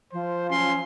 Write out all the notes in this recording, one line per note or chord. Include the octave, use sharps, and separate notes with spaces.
F3 C5
F#3 C#4 C6